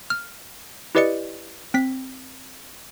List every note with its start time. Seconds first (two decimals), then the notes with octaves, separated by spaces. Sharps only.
0.10 F6
0.95 E4 G4 B4 D5 D#5 C#7
1.74 C4 B6